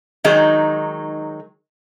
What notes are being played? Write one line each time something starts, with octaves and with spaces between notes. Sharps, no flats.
D#3 F#3 G#3 D#4